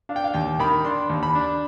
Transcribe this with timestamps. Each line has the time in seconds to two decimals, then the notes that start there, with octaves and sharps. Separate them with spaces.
0.09 D4 F5
0.16 G5
0.24 F5
0.34 D#2 G5
0.59 D#3 B5
0.84 D4 C6
1.10 D#2
1.23 B5
1.35 D4